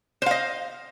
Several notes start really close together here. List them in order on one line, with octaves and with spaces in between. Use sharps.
C5 F5 D#5